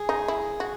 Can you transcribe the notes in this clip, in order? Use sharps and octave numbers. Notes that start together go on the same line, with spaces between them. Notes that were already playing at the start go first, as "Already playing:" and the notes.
Already playing: G#4
D#4
E4
F#4